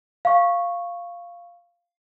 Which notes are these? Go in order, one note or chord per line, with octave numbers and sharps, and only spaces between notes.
F5 C#6